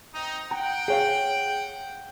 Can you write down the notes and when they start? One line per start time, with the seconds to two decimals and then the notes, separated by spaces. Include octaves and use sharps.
0.13 C4 D#4
0.51 F#5 G5 A#5
0.88 G#4 C#5 F5